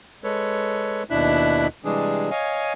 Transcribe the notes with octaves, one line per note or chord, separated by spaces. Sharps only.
G#3 A4 B4 C#5
D#2 B2 D4 E4 E5 F#6
C3 E3 G3 G#3 D4 G#4
C#5 D#5 F5 G#5